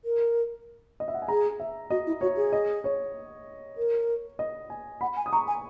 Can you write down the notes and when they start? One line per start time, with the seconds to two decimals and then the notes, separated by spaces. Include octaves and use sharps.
0.05 A#4
1.00 D#5
1.08 E5
1.14 F#5
1.22 G#5
1.28 G#4 A#5
1.60 E5
1.90 F#4 D#5
2.07 E4
2.21 F#4 C#5
2.36 G#4
2.53 D#5
2.84 C#5
3.77 A#4
4.39 D#5
4.70 G#5
5.01 F#5 B5
5.16 G#5
5.26 D#6
5.32 A#5 C#6
5.47 G#5